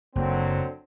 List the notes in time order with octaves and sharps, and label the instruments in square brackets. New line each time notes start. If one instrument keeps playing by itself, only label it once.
[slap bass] F#1 A#3 [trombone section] D3 F#3 C4